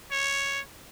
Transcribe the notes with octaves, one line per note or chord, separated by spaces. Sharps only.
C#5